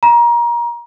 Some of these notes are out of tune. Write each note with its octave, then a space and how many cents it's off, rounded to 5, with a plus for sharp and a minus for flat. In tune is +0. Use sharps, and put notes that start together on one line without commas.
A#5 +25